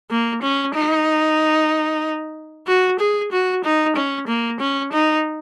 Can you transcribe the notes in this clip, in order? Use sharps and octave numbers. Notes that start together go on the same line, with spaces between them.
A#3
C#4
D#4
F#4
G#4
F#4
D#4
C#4
A#3
C#4
D#4